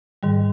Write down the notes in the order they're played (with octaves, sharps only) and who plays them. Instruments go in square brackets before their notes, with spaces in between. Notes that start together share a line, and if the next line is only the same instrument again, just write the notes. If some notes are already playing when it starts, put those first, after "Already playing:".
[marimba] G#2 D#3 G3